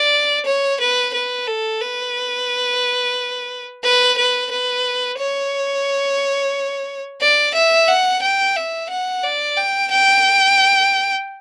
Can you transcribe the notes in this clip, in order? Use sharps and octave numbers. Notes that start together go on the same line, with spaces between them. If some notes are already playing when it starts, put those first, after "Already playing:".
Already playing: D5
C#5
B4
B4
A4
B4
B4
B4
B4
C#5
D5
E5
F#5
G5
E5
F#5
D5
G5
G5